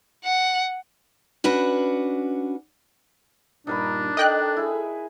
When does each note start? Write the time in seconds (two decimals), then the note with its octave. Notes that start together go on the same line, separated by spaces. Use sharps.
0.24 F#5
1.44 C#4 D4 F#4 B4
3.67 G2 A#2 D4 D#4 A#4 B5
4.17 A4 D#5 G5 F#6
4.57 E4 G#4